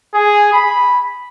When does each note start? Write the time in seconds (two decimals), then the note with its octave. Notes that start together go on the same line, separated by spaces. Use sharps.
0.14 G#4
0.53 B5